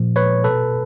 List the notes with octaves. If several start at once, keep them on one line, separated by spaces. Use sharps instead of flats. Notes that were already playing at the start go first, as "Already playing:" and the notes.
Already playing: A#2 F3
B4 C#5
B2 A4 B4